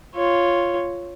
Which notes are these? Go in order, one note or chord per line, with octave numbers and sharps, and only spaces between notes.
F4 C#5